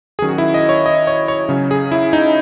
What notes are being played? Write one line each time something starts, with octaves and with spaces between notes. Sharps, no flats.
D#3 F#3 C#4 G#4
F#4
E4
D#5
C#5
D#5
C#5
C#5
C#3 F#3 C#4
G#4
E4
D#4